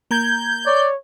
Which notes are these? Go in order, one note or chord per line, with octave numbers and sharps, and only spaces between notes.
A#3 A#5 G6 G#6
C#5 D5